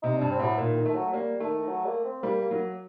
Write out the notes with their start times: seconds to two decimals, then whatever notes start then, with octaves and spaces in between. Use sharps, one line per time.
0.03 C3 D#4
0.17 G2 D4
0.31 C4
0.39 A2 F#3
0.58 A#2 D#3
0.77 D#3
0.86 A3
0.95 F#3
1.12 G3 A#3
1.40 D#3 A3
1.60 D#3
1.68 F#3
1.86 A#3
2.04 C4
2.23 G3 A#3
2.42 A#3
2.51 F#3